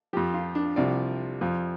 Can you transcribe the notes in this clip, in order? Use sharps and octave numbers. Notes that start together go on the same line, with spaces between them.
F2 F3 G4
F4
D4
C2 C3 F3 D5
F2 F3